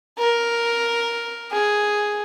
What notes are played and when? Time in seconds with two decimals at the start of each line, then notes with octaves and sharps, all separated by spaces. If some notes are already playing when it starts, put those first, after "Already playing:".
0.18 A#4
1.51 G#4